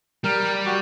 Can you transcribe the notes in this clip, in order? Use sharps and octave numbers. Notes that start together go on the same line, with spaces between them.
G3 A#4
F#4 G4